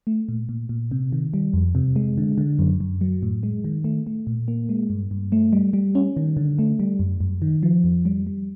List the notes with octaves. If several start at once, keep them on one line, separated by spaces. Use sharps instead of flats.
A3
A#2
A#2
A#2
C3
D#3
G3
F2
C3
G#3
D3
D3
F#2
F#2
F#3
A2
G#3
D#3
A3
A3
A#2
A#3
G#3
G2
G2
A3
G3
G3
C#4
D#3
D3
A3
G3
F#2
F#2
D#3
F3
F2
G3
G3